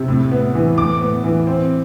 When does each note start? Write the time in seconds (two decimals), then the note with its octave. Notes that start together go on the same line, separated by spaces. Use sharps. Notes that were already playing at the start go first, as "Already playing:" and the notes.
Already playing: C3
0.08 A2
0.31 B3
0.55 E3
0.78 A2 D6
1.01 B3
1.24 E3
1.47 C4